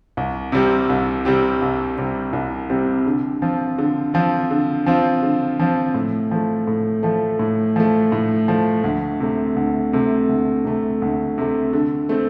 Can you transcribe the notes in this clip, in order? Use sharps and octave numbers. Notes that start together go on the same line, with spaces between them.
C2
C3 G3 C4 G4
C2
C3 G3 C4 G4
C2
C3 G3 C4 G4
C2
C3 G3 C4 G4
D3
F3 C4 F4
D3
F3 C4 F4
D3
F3 C4 F4
D3
F3 C4 F4
A2
F3 A3
A2
F3 A3
A2
F3 A3
A2
F3 A3
D2
C3 A3
D2
C3 A3
D2
C3 A3
D2
C3 A3
D3
A3 C4